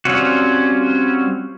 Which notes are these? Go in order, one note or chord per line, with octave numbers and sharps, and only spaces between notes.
G3 C4 C#4 F4 F#4